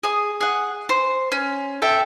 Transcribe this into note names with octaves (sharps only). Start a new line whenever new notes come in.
G#4 D#6
G#4 F#5
C5
C#4
A4 E5 G5